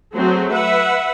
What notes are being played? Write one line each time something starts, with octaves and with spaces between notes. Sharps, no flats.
F#3 A3 C4 F#4 G#4
B4 E5 F#5